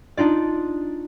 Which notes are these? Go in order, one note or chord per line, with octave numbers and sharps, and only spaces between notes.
D4 D#4 F4 D5